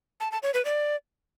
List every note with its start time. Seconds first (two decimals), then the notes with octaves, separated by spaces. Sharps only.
0.20 A5
0.32 A5
0.43 C#5
0.54 B4
0.65 D5